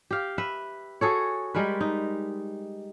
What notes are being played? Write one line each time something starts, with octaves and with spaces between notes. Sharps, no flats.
G4 F5
B4 E5
F#4 G#4 A4 C#5
G3 G#3 A#4 B4
D#4